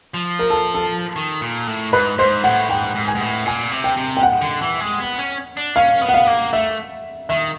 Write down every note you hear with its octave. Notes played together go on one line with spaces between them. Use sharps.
F3
A#4
A4
A4
D#3
A#2
A2
G#2 B4
G#2 C5
A2 F#5
G#2 G5
G#2
G#5
G#2
A2
A#2 G#5
C3
G5
C3
G5
F#5
D3
E3
G#3
B3
C#4
D4
C#4 F5
B3
F#5
F5
A#3
A3 E5
D#3 E5